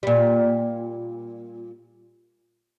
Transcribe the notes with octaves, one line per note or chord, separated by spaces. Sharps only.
A#2 G3